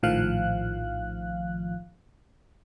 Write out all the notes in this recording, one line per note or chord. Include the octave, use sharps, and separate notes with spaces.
A#1 A2 D#3 F3 F5 F#6